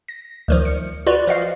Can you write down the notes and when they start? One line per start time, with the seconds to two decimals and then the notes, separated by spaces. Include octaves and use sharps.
0.08 A#6
0.48 D2 D#3 F3
0.65 C#7
1.07 F4 F#4 B4 D5
1.27 F3 D#5 F5